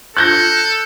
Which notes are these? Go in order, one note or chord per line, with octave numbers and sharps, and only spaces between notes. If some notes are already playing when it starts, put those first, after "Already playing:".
A4 F#6 G6 A#6